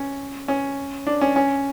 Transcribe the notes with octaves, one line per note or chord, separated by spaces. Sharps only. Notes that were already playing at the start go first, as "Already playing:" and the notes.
Already playing: C#4
C#4
D4
C#4
C#4